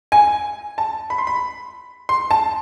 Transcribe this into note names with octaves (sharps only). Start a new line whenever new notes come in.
G#5
A5
B5
C6
B5
C6
A5